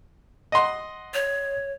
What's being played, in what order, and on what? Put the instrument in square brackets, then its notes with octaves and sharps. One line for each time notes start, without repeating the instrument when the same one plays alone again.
[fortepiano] D#5 F#5 C6
[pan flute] C#5